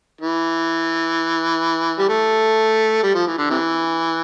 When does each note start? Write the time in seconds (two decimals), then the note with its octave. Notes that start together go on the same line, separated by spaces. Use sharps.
0.21 E3
1.99 G3
2.09 A3
3.03 G3
3.15 F3
3.27 E3
3.38 D3
3.50 C3 E3